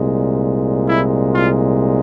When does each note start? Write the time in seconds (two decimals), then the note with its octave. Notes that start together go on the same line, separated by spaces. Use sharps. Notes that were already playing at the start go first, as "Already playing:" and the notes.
Already playing: C2 A#2 G#3
0.86 E4
1.34 F4